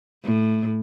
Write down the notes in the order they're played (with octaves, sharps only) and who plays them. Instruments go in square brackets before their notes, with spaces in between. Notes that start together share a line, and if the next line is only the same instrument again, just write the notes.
[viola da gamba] A2